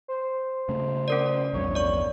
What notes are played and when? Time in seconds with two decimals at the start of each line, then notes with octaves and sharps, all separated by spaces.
0.08 C5
0.69 C#3 A3
1.08 C#4 A#4 D5
1.53 A#1 E2 G2 C#5
1.75 D5 C#6